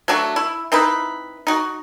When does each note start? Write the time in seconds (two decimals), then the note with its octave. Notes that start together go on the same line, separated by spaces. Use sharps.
0.08 F#3 A3 D4 F#4
0.36 E4
0.72 C4 D#4 E4 B4
1.47 D#4 F#4